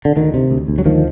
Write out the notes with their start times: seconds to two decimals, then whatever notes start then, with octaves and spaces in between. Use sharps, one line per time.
0.05 D3
0.16 D2 D#3
0.34 C3
0.51 D2
0.68 D2
0.78 F#3
0.86 D2 D#3 F3